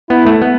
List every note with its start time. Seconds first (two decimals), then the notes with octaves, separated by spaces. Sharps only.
0.10 B3 E4
0.27 A3
0.42 B3